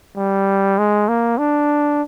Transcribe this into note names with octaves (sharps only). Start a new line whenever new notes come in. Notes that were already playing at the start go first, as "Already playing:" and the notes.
G3
G#3
A#3
D4